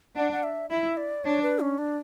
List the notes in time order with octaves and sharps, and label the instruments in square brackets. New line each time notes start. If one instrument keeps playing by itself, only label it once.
[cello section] D4 [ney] F#5
[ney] F#5
E5
[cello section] E4 [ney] E5
[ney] D5
[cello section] D4 [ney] C#5
[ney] B4
C#4
D4